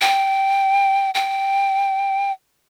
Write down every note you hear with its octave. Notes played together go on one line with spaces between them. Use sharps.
G5
G5